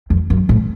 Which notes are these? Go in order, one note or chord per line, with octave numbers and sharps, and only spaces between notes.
F2
F#2
A2